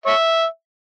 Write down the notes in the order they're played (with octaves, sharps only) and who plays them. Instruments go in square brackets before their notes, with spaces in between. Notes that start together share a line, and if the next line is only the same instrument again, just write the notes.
[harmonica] C#5 E5